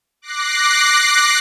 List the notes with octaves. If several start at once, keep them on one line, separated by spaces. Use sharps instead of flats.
D6 F#6 A#6 C7